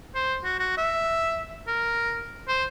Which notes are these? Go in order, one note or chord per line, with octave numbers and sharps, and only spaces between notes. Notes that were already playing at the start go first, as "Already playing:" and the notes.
C5
F#4
F#4
E5
A#4
C5